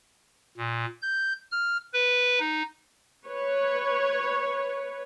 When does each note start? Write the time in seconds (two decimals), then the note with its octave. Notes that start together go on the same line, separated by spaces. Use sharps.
0.57 A#2
1.02 G6
1.52 F6
1.94 B4
2.40 D#4
3.27 B4 C#5